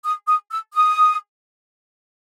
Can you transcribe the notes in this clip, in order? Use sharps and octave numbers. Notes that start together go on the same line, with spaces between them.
D#6
D#6
E6
D#6